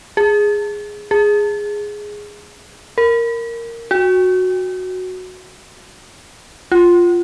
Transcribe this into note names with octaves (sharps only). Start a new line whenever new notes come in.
G#4
G#4
A#4
F#4
F4